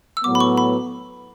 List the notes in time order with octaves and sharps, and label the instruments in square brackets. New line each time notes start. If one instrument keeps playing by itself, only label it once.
[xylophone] E6
[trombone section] A2 F#3 B3 [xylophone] D6
[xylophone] B5
C#6
B5